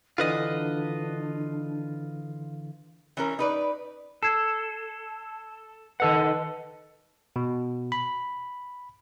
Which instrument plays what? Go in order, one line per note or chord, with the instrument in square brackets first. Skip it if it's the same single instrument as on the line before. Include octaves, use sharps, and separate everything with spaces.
[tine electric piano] D3 E3 [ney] D4 [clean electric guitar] F4 B4 D#5
[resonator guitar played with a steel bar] E3 C#4 A#4
D#4 B4 D5
[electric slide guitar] A4 [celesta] G#6 C7 E7
[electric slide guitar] D#3 A4 F#5 [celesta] B4 D#5 A5
[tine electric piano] B2
B5